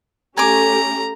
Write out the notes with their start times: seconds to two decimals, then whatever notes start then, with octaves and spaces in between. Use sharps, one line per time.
0.37 A3 C#4 G4 G#5 A#5 D6